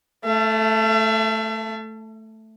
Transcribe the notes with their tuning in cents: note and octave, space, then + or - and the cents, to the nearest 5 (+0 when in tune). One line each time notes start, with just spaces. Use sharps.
A3 +0 E5 +45